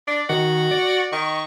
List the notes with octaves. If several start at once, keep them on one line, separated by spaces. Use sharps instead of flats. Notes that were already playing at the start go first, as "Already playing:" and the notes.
D4 D5
D#3 F#4
D5
D5
D#3 C#6